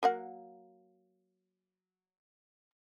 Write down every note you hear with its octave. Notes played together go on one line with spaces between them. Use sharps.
F#3 A#3 F#5